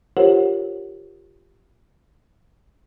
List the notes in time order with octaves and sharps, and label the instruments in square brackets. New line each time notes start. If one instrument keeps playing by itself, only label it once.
[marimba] F4 G4 A#4 C5 C#5 F#5